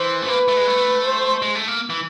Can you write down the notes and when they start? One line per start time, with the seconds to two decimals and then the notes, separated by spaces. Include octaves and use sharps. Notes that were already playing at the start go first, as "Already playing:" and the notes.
Already playing: E3 C5
0.22 A3
0.28 A#3 B4
0.48 A3
0.57 G#3
0.67 A3
1.04 C5
1.42 G#3
1.55 A3
1.68 A#3
1.90 E3